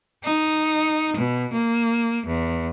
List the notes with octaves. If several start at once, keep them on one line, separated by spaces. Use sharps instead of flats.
D#4
B2
A#3
E2